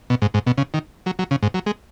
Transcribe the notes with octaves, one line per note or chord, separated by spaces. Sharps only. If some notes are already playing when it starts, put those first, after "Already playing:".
B2
G#2
G#2
B2
C#3
D#3
F#3
F#3
C#3
G#2
F#3
G#3